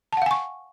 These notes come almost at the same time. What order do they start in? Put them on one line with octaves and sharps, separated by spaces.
A5 F#5 F5 G#5 C#6